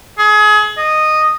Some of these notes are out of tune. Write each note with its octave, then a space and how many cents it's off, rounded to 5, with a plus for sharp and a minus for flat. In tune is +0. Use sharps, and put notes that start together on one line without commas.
G#4 +30
D#5 -10